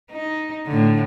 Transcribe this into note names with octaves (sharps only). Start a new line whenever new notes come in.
D#4
A2 D3